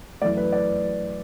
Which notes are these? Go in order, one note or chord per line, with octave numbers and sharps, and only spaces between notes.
F#2 E3 A3 D5
B4
D5